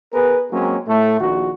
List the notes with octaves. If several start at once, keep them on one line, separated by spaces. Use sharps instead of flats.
B3 G#4 A#4 B4
F#3 G#3 A#3 C4 C#4
A2 A3
A#1 A#2 D#3 F#4